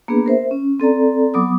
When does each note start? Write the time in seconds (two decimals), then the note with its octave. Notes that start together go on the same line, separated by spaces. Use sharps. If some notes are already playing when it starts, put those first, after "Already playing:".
0.08 A#3 B3 D4 G#4 B4
0.26 A#4 C5 E5
0.51 C#4
0.80 C4 A4 D5 A#5
1.34 F#3 B3 D6 D#6